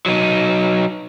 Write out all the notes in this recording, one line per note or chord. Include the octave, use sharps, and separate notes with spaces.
F#3 D#4